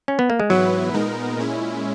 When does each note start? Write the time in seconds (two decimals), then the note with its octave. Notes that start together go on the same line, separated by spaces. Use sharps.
0.08 C#4
0.19 B3
0.30 A#3
0.40 G#3
0.50 G#2 E3 F#3 B3 E4 B4
0.94 A#2 G#3 B3 D#4 A#4
1.37 A#2 G#3 C#4 E4